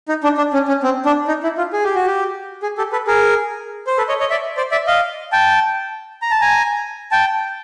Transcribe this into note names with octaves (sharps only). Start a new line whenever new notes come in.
D#4
D4
D4
C#4
C#4
C4
D4
D#4
E4
F4
G#4
G4
F#4
G4
G#4
G4 A4
A4 B4
G#4 A#4
C5
A4 B4
C#5 D#5
C#5 D#5
D5 E5
C5 D5
D5 E5
D#5 F5
G5 A5
A#5
A5
G#5 A#5
G5 A5